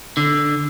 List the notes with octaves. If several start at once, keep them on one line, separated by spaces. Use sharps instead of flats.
D3